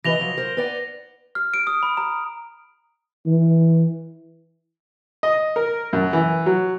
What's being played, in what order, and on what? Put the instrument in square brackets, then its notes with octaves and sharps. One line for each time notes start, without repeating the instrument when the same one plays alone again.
[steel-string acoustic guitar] E3 B4 D#5 [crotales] A#6 F7 G7
[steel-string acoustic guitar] F3 F#3
A#4 C5
B4 D5 F#5
[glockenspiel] F6
D7
D#6
B5
A#5
[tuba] E3
[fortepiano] D#5
A#4
F#2
E3
F#3